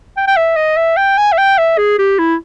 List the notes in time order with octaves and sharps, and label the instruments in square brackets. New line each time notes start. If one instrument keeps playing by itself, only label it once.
[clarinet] G5
G5
E5
D#5
E5
G5
G#5
E5
G5
E5
G#4
G4
E4